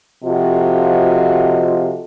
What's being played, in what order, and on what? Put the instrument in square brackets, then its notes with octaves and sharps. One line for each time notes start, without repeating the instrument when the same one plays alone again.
[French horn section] C3 F3 F4 F#4 A4 D#5